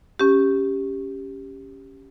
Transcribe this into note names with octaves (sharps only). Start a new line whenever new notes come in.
C#4 G4